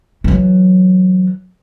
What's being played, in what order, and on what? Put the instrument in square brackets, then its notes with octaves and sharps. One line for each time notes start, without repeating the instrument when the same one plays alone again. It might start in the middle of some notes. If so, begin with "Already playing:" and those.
[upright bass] E3 F#3